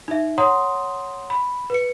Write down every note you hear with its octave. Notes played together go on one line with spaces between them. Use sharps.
D#4 E5
C#5 F#5 A#5 C6 D#6
B5
B4 C#7